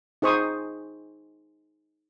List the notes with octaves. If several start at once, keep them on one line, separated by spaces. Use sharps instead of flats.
D#4 G#4 C5 C#6 D#6